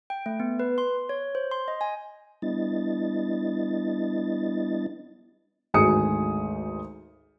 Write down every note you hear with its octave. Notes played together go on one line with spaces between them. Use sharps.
G5
A3
B3
B4
C6
C#5
C5
C6
D#5
G#5
G3 B3 D4 E4 D#5 A6
G#1 D2 G#4 D#6 C#7